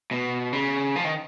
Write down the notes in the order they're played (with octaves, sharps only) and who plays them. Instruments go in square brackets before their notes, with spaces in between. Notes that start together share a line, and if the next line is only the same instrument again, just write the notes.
[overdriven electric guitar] B2
C#3
F3
D#3